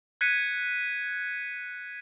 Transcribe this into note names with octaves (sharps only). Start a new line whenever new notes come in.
F#6 G#6 B6 C#7 D#7